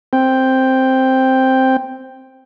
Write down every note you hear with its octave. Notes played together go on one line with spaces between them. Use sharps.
C4 G5